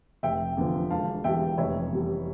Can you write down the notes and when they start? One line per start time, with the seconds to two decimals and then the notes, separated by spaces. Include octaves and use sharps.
0.23 F1 E5 G5
0.57 E2 D3 F3
0.90 E1 F5 A5
1.24 E2 E3 G3 E5 G5
1.58 F1 C#5 E5
1.91 E2 E3 G3